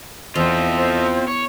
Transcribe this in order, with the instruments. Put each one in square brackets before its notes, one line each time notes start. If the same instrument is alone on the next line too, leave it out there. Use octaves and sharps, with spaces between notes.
[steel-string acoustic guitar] E2 [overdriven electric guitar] C4 F4 [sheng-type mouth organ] A4 D#5 E5 [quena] C5
[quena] C5
[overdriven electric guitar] C#5